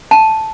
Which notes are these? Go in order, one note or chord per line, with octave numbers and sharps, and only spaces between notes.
A5